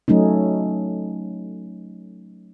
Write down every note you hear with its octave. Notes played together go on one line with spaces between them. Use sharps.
F#3 A3 C#4 D#4